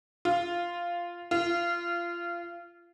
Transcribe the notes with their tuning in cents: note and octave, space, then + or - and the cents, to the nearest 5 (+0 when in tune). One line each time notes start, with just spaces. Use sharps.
F4 -5
F4 -20